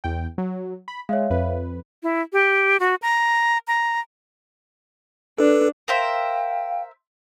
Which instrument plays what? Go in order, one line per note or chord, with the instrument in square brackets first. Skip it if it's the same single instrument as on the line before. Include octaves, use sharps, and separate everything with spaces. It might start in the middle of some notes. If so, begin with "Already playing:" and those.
[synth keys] E2 G5
F#3
B5
[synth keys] G#3 [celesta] C#5 E5 F5
[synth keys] F2 B4
[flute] E4
G4
F#4
A#5
A#5
[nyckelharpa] D4 [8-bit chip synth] A4 B4
[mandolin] A#4 C5 E5 [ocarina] F5 [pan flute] G5